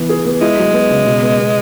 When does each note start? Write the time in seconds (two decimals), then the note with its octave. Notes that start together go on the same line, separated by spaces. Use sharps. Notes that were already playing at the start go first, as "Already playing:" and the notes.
Already playing: E3 B3
0.09 G#4
0.25 B3
0.41 G#3 E4
0.57 F#3
0.73 B3
0.89 C#3
1.05 B2
1.22 B3
1.37 B3